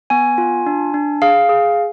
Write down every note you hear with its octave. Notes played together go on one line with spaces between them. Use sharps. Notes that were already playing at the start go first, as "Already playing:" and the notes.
B3 G#5
F4
D4
D4
G#4 F5
G#4